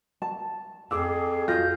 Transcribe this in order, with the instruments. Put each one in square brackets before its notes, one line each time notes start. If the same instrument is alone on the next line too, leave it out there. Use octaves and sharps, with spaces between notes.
[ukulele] A5
[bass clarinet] F2 [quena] G#4 [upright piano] D6 E6
[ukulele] F4 [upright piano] F#4 A#6 [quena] G6